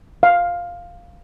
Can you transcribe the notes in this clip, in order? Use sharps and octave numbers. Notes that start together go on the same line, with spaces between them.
F5